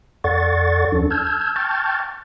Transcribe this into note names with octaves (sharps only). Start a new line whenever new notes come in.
F2 A4 D5 F#5 C#6 A6
D#2 F3 C#4 D4 A4
A5 E6 F6 G6 G#6
G5 A5 C#6 F6 G6 A6